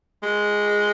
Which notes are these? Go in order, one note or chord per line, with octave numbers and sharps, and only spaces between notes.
G#3